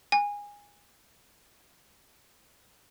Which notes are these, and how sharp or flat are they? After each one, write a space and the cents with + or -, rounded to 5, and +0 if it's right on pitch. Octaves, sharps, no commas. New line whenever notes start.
G#5 -20